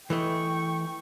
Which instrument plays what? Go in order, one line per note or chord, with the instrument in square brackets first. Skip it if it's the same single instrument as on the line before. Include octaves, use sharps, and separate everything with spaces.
[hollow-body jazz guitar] E3 A3 D#5 [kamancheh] G5 C#6